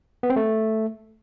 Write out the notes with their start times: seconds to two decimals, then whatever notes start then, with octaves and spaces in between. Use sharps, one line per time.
0.23 B3
0.30 C4
0.36 A3